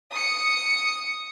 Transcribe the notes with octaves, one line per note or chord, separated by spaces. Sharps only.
D#6 C#7